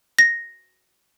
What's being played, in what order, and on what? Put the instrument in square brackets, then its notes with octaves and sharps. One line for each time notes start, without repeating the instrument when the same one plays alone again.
[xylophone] A#6